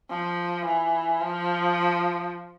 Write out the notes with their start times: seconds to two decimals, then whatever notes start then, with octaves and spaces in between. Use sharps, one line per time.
0.10 F3
0.65 E3
1.21 F3